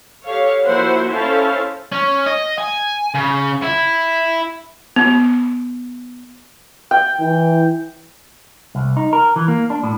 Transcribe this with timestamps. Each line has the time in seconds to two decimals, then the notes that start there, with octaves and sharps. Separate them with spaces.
0.24 G4 A4 C#5 F5
0.63 F3 A#3 E4 F#4 C5 F#5
1.09 C#4 E4 A4 C5 F5 A5
1.92 C#4
2.26 D#5
2.58 G#5
3.14 C#3
3.64 E4
4.96 B3
6.91 G5
7.20 E3
8.75 C2
8.97 D#4
9.13 A#4
9.36 E3
9.48 A#3
9.70 D4
9.83 A2